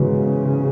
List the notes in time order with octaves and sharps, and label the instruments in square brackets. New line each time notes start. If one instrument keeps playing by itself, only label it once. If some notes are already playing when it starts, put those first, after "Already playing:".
Already playing: [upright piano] G#2 E3 B3 F#4 [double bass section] C#3